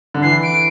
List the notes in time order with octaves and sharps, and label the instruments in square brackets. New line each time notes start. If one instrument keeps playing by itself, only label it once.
[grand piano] D3
[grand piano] E3 [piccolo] C7
[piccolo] D7